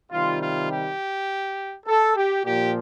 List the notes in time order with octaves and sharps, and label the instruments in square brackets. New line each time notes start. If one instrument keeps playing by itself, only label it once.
[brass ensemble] C3 D#3 G3 F4
F4
G4
A4
G4
A#2 F3 G4